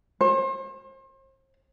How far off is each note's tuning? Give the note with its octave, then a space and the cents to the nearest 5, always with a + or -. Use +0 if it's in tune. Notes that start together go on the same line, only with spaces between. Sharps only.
C5 +40